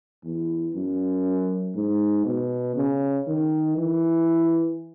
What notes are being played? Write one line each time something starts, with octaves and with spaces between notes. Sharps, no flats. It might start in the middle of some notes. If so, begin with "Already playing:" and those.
E2
F#2
G#2
B2
C#3
D#3
E3